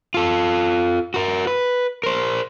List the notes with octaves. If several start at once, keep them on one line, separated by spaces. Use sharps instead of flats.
F4 A4
F#4 A#4
B4
A#4 C5